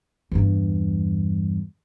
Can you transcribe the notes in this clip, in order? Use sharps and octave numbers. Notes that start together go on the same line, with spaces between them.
E2 G2